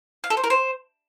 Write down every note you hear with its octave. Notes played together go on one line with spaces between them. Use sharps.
F5
A4
C5
A#4
C5